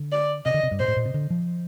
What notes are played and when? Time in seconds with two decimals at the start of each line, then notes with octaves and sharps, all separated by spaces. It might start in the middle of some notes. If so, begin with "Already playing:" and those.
Already playing: D3
0.12 D5
0.46 C3 D#5
0.54 D3
0.63 C3
0.71 G2
0.80 A#2 C5
0.88 A2
0.97 A#2
1.06 C3
1.14 D3
1.30 F3